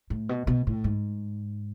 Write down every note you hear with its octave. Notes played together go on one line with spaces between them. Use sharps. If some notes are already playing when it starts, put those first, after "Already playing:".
A2
B2
B2
A2
G#2